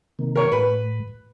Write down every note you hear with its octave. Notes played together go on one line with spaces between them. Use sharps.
C3 D#3 A#3
A#4 C#5
A2 B4